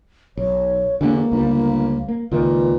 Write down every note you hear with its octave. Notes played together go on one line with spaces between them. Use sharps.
B1 C#5
E1 D3 A#3
G1 C#2 G3
A#3
C#2 A#2 D#3 B4